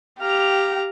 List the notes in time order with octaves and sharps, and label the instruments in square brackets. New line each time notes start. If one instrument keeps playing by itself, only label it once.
[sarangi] G4 [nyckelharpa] F5 A#5